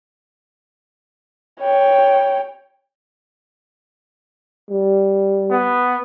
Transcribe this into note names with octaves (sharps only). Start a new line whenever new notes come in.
C#5 G5
G3
B3